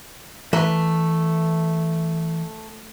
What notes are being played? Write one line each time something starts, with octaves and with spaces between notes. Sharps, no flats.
E3 A3 B4 A#5